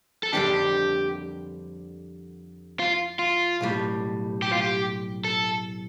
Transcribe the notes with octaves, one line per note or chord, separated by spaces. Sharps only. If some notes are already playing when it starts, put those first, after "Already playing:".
A4
F2 D3 G3 D4 G4
F4
F4
B1 A2 G3
G4
F4
G4
A4